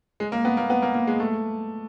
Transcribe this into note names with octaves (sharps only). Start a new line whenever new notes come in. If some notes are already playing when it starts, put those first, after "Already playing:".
G#3
A#3
B3
A#3
B3
A#3
A#3
G#3
A3